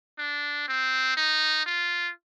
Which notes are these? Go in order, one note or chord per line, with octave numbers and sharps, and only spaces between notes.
D4
C4
D#4
F4